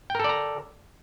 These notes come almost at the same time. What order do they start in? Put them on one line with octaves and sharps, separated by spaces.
G5 A#4 A4 D5 A#5